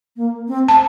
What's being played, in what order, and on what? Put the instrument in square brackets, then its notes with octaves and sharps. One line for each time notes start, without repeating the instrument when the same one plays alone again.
[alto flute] A#3
C4
[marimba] A5